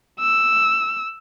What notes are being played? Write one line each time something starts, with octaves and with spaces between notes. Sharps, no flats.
E6